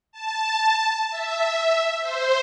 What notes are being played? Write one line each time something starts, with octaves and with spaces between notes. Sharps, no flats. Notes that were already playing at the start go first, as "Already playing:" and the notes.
A5
E5
C5